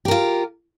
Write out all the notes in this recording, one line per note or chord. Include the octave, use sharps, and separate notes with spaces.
F4 G4 A#4